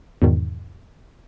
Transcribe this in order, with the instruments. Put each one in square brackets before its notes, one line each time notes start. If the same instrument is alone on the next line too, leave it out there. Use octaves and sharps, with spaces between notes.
[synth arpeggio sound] E2 G#2 B2 D#3